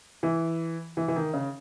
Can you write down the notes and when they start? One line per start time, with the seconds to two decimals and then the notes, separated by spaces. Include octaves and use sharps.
0.23 E3
0.97 E3
1.08 E3
1.16 D#3
1.33 C#3